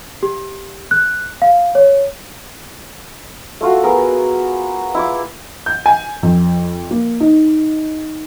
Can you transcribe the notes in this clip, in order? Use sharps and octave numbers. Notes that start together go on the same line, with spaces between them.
G4
F#6
F5
C#5
A3 F4 F#4
B3 G#4 A#4
E4 F4 D6
G6
G#5
F2
A#3
D#4